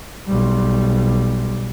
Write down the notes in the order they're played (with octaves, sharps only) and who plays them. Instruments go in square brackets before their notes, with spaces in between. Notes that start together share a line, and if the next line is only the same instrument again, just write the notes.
[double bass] B1 G3